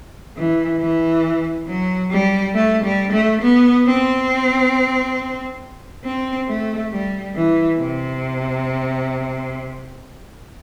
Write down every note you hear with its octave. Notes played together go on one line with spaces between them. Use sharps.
E3
E3
F#3
G3
A3
G3
A3
B3
C4
C4
A3
G3
E3
C3